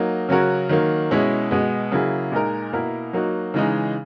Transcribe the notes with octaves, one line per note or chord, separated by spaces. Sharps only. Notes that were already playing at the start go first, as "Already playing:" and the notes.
Already playing: F#3 A#3 D#4
C#3 F#3 C#4 F#4 A#4
D#3 F#3 A#3
B2 G#3 C#4 E4
B2 G#3 B3
C#3 F#3 A#3 E4 G#4
A#2 G#3 D#4 A#4
B2 A#3 E4 A#4
F#3 A#3 D#4 F#4
C#3 E3 G#3 D#4